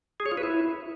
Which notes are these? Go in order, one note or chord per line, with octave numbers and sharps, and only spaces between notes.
G#4
C#5
F4
B4
E4